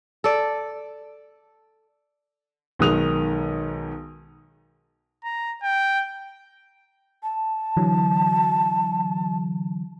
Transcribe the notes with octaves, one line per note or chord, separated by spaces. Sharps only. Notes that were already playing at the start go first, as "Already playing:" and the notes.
A4 D5
B1 D#3 G#3 D#6 F7
A#5
G5
A5
D3 E3 F#3